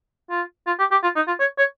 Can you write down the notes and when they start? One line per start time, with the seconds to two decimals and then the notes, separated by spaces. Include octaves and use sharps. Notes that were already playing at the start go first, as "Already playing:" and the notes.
0.30 F4
0.67 F4
0.79 G4
0.91 G4
1.03 F4
1.16 D#4
1.27 F4
1.40 C#5
1.58 C#5